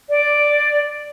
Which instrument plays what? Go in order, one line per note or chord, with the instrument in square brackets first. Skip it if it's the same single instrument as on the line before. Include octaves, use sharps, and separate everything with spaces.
[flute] D5